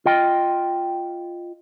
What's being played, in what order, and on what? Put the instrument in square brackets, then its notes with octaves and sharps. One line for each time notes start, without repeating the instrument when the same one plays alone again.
[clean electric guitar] F4 D#5 G5